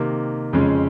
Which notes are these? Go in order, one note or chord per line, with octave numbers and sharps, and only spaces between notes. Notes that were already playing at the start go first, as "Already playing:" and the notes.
Already playing: C3 D#3 A#3
F2 C#3 G#3 C#4